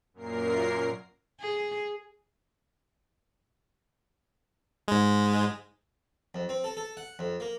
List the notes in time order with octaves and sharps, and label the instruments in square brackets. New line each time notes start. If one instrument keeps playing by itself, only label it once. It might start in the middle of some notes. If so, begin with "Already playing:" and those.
[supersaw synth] F#2 A#2 A#4 C7
[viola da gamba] G#4
[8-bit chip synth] G#2 G#3
[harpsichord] F2
C4
A4
A4
F#5
F2
A#3